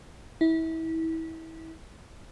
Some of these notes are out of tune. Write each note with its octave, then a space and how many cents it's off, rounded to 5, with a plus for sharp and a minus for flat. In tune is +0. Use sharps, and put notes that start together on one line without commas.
E4 -30